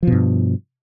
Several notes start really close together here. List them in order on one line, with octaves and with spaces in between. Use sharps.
F3 B2 G2